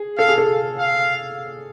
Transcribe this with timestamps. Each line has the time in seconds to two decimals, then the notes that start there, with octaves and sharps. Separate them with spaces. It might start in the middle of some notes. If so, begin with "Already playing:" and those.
Already playing: G#4
0.18 A4 F5
0.28 G#4
0.38 A4
0.79 F5